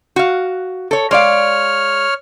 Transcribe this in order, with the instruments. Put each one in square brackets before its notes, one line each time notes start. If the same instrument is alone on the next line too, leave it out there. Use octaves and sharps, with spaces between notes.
[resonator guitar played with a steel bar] F#4 F5
A4 C#5
[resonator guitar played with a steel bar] G#3 D5 F5 [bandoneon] C#5 F6